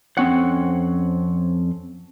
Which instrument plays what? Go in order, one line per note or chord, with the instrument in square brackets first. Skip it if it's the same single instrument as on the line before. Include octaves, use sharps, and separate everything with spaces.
[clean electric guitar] F2 C4 C#4 F#5